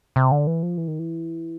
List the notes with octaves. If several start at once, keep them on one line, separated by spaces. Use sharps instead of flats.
C3
D3
E3
F3
E3
D#3
E3